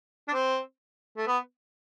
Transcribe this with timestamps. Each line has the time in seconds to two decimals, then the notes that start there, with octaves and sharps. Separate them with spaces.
0.28 D4
0.33 C4
1.17 A3
1.27 B3